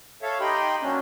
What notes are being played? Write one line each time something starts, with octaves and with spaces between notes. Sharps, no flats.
A4 C#5 E5 F5
D#4 G4 D#5 G5 B5 C6
F#3 A#3 C#4 D4